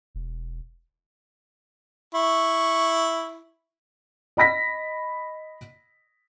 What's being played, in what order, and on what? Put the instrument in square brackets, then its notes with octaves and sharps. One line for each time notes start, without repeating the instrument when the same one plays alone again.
[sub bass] E1
[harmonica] E4 C#6
[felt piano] D#5 B5 A#6 B6